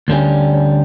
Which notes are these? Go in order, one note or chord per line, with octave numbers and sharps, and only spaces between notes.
D2 D3 G3 C#4